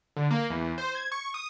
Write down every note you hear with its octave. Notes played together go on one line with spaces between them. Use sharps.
D3
A#3
E2
E2
C5
G#6
C#6
D#6